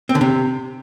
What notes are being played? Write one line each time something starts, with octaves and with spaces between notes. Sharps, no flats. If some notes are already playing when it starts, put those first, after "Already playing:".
C4
D3
C3